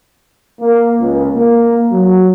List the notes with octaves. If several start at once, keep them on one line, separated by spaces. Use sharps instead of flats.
A#3
C#2
A#3
F#3